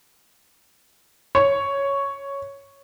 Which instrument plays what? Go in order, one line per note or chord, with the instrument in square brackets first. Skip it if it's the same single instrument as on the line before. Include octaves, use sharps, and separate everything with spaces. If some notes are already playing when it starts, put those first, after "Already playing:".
[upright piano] C#5